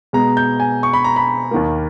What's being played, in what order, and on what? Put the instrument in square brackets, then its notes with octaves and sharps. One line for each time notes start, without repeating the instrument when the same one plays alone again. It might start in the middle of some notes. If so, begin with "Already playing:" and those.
[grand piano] B2 G#3 B3 A#5
G6
G#5
C#6
B5
A#5
B5
D#2 D#3 A#3